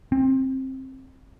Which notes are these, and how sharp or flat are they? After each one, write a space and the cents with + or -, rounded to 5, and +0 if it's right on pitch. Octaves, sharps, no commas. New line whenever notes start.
C4 +20